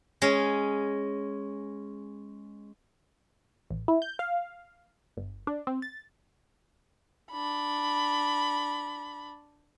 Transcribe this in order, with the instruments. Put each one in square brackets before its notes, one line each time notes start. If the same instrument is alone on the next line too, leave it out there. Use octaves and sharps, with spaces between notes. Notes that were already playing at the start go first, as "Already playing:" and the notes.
[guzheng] G#3 C#4
[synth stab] A1
E4
G6
F5
G1
D4
C4
A6
[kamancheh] D4 B5